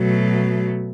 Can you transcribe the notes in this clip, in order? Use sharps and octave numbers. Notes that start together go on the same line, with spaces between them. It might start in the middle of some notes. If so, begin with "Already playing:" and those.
Already playing: B2 F#3 A3